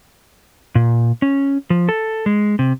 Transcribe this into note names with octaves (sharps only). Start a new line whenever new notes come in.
A#2
C#4
F3
A4
G#3
C3